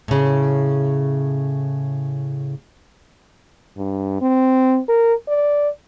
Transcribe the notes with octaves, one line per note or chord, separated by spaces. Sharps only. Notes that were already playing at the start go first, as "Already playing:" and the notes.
A2 C#3
G2
C4
A#4
D5